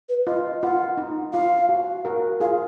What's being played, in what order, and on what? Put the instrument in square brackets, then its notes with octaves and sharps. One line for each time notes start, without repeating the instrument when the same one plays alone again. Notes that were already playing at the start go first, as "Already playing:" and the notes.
[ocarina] B4
[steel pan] F4 [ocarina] D#5
[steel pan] F4 [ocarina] F#5
[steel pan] D#4
[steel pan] F4 [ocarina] F5
[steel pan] F#4
F#4 A#4
[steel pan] F4 G#4 [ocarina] F5